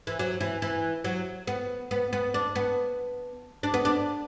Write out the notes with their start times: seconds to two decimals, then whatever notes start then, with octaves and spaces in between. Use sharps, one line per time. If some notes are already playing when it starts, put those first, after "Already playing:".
0.07 E3
0.19 F#3
0.40 E3
0.62 E3
1.04 F#3
1.47 B3
1.91 B3
2.13 B3
2.34 D4
2.55 B3
3.63 D4
3.74 B3
3.85 D4